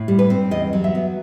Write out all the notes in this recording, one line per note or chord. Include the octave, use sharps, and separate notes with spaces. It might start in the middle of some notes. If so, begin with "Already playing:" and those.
Already playing: A2
G3
B4
C4
E2 D#5
F#3
E5
B3